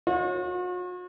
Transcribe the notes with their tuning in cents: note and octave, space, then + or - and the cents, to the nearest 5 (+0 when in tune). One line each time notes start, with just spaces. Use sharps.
F#4 -45 C#5 -25